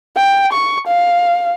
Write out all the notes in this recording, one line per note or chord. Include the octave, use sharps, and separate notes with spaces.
G5
C#6
F5